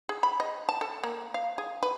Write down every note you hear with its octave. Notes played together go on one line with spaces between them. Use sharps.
G#4
B5
D#5
A5
A4
A#3
F5
G#4
B4